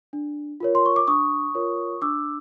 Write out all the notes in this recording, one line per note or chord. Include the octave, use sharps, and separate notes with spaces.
D4
F4 A#4 C#5
C6
C#6
D6
D4 C#6 D#6
F4 A#4 C#5
D4 D6 E6